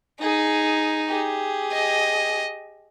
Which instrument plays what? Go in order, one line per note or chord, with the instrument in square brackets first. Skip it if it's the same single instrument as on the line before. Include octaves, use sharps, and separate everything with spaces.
[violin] D#4 [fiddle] G#4
[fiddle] G4 G#4
[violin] D#5